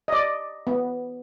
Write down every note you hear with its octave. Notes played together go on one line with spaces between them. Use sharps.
D5 D#5
B3